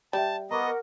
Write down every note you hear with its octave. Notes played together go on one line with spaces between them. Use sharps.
G3 D5 E5 A5
B3 A#4 D#5 F#5 A#5 C#6 D6